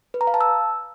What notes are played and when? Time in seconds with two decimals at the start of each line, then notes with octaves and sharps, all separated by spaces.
0.14 B4
0.21 A#5
0.27 F5
0.34 A5
0.41 E6